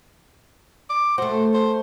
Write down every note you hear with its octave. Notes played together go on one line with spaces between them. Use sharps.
D6
A3 F#4 C5
C5